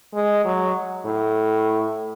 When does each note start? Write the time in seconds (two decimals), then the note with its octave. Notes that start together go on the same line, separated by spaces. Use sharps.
0.14 G#3
0.45 F#3
1.05 A2